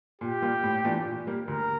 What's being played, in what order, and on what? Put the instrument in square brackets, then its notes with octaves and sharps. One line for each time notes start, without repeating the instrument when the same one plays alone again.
[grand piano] A#2 [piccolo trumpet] G4
[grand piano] G3 A#3 F4
A2
E3 A3 D4 F4
A#2
G3 A#3
[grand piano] D2 [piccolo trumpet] A#4